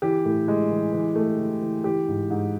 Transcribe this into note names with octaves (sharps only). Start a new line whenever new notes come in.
E3 G4
A2
G#3
E3
E3
A3
E3
E3
E3 G4
G#2
G#2